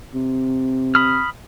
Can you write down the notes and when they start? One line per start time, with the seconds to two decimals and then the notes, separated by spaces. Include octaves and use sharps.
0.14 C3
0.95 B5 D#6 F6